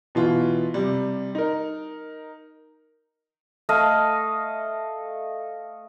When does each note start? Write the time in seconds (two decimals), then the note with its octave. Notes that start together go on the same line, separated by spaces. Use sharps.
0.15 B2 E3 F4
0.74 C3 G3
1.35 D#4 A#4
3.69 A3 D#5 F5